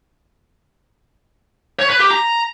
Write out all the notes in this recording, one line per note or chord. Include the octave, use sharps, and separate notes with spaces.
C#5
B4
G4
A#5